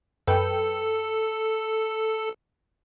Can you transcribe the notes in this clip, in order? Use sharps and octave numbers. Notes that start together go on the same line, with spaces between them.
F#2 A4 B4 G5